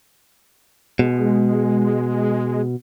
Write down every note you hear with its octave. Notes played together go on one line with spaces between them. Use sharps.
B2 G#3